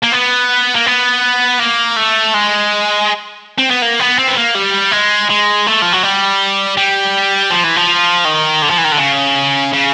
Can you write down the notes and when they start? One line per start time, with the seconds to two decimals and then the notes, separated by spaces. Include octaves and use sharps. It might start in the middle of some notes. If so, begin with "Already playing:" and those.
0.03 A#3
0.12 B3
0.75 A#3
0.86 B3
1.60 A#3
1.97 A3
2.34 G#3
3.58 C4
3.70 B3
3.82 A#3
4.00 B3
4.19 C4
4.28 B3
4.37 A#3
4.55 G3
4.92 G#3
5.30 G#3
5.67 A3
5.82 F3
5.93 F#3
6.03 G3
6.77 G3
7.51 F3
7.64 E3
7.76 F3
8.25 D#3
8.62 D3
8.70 F3
8.78 E3
8.84 D#3
8.92 D3
8.98 C#3
9.73 C#3